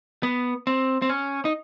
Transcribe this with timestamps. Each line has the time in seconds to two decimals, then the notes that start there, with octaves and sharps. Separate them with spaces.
0.23 B3
0.67 C4
1.02 C4
1.10 C#4
1.45 D#4